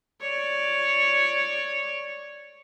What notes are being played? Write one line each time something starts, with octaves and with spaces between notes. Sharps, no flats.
C#5 D5